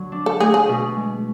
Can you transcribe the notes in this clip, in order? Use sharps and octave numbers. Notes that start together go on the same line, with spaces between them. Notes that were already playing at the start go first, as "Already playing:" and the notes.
Already playing: D3 F#3
D4
A4
A3 G#4
G#4
B2
G#3